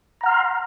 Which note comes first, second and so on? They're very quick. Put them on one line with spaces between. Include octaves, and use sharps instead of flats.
A#5 F#5 F6 C6